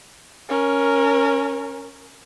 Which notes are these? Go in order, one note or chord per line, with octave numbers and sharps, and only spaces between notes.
C#4 A#4